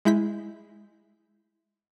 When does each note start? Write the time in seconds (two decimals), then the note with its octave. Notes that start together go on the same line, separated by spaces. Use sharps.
0.05 G#3 E4 G6 B6